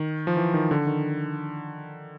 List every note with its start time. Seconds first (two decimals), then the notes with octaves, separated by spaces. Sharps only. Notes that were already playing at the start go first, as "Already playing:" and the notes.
Already playing: D#3
0.27 F3
0.37 E3
0.54 D#3
0.71 D3
0.87 D#3